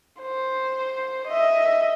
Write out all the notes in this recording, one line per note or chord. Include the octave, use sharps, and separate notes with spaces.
C5
D#5 E5